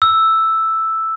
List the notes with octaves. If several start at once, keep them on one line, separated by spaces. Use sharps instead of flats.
E6